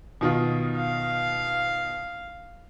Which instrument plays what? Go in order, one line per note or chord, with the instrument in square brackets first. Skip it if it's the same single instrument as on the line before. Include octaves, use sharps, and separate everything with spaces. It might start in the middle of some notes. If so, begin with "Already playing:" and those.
[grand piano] B2 D#3 F4
[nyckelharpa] F5